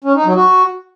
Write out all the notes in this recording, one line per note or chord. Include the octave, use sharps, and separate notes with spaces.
C#4
D#4
F#3
F#4